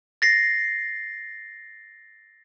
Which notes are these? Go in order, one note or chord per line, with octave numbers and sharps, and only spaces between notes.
A6 A#6 C7